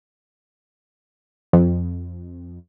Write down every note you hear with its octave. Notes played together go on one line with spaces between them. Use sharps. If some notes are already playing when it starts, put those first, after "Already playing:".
F2